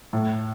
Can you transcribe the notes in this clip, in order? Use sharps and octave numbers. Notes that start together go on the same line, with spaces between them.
A2